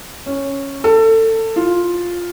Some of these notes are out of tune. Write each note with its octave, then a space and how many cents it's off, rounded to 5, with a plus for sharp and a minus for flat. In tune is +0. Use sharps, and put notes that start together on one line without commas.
C#4 -5
A4 +25
F4 +5